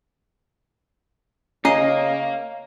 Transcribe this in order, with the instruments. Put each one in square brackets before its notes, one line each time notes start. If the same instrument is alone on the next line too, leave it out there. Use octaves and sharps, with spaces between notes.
[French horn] C#3 [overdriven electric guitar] A#3 [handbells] C#4 A#5 C7 [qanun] D#5